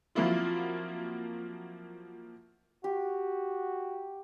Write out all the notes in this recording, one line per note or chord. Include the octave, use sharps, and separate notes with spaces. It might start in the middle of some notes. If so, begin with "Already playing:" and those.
F3 F#3 A#3 C4 E4 F4
F#4 G4